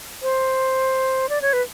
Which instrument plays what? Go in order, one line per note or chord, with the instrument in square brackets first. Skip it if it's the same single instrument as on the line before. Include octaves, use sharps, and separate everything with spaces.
[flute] C5
D5
C#5
B4